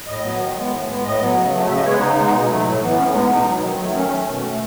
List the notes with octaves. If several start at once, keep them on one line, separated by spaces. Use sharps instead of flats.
A2 D#5
F#3 B3
D#3
G#3 B3
A2
G#3 B3
A2 D#5
F#3 B3
C#3
F#3 A3
C#3 E5
D#5
G#3 B3 C#5
B4
C#3 D#4
G#3 B3
B2
F#3 A3
A2
E3 B3
A2 C#4
G#3 B3 D#4
B2 D#4
F#3 B3
D#3
F#3 A3
D#3 C#4
A3
B2
A3